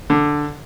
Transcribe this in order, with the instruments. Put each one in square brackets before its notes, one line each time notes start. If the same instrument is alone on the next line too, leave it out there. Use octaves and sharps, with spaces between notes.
[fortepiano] D3